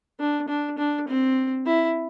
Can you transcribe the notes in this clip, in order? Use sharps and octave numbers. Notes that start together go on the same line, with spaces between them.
D4
D4
D4
C4
E4